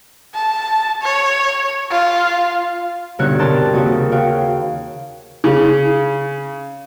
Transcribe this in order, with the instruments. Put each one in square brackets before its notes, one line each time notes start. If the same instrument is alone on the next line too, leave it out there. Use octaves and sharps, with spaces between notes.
[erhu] A5
C#5
F4
[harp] G2 B2 D3 D#4 C#5 F#6
C3 G4 A#4 A5 C6
D#2 C#3 F#4 C#6 D#6
F#4 C#5 F5 G5
[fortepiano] C#3